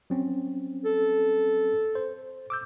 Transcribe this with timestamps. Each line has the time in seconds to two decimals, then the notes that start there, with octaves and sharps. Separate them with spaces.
0.10 F#3 C4 C#4
0.84 A4
1.95 C5
2.50 D6 E6 G6